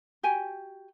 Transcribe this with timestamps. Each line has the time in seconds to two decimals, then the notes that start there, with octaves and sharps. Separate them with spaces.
0.23 F#4 G4 G5 G#5